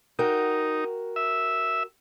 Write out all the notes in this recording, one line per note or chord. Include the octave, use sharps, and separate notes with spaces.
D#4 F#4 A#4 G5
E5